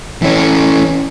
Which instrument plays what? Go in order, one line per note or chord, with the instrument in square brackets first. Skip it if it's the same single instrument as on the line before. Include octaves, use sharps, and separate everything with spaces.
[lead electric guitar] E3 C#4